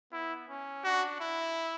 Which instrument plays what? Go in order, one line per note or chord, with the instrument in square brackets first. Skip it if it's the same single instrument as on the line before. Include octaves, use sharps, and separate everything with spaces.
[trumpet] B3 [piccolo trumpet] E4
[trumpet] C#4
[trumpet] D4 [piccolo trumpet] F#4
[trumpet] E4